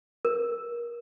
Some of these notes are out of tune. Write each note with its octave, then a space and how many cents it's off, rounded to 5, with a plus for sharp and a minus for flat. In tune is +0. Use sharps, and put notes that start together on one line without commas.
A#4 +25